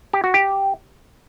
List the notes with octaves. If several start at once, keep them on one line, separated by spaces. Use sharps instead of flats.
G4
F#4
G4